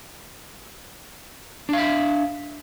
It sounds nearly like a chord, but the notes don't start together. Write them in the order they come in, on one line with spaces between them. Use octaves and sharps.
D4 F5 E5